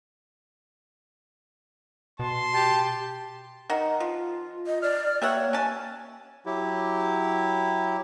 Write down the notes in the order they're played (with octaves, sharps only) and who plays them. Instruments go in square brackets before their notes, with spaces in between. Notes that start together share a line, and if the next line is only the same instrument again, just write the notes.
[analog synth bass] B2 [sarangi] A5 [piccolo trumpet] C6
[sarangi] G4 [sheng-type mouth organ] A5
[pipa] D#3 [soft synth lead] F#5
[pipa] F3 [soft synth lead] F4
[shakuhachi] D#5
[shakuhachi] D5 [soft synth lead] F6
[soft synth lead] A#3 [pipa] G4 E5 F#5 [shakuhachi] C#5
[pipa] C#4 A5 [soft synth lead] G#5
[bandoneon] F#3 E4 G4